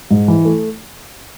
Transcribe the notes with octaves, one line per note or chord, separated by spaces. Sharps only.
G#2
E3
A3